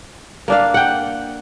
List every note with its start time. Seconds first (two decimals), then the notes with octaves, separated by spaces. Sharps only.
0.48 A#3 D4 F5
0.74 F#5 G5